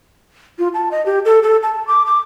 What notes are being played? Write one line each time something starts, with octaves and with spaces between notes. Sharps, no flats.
F4
A5
D#5
G4
A4
A4
A5
D6
D6